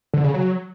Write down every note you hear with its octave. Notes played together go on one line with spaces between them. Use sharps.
D3
C#3
F#3